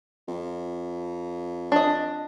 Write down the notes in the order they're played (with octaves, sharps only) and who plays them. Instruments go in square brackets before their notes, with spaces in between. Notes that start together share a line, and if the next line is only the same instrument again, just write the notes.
[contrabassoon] F2
[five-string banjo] D4 D#5